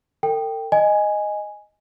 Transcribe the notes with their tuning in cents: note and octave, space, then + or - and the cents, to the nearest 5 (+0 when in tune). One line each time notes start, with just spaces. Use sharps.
A4 +45 G5 +0
D#5 -5 G#5 +0